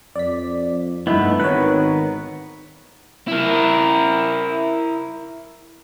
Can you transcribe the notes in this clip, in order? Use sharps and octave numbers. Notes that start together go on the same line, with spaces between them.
F2 D5 B6
G2 A3 B3 D#4 E4
G#1 D#3 B3 B4 C#5 F#6
E4 A#4